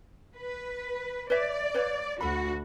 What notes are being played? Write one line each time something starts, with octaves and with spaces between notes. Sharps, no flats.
B4
B4 C#5 D5 E5
B4 C#5 F5
D2 F#4 A4 B5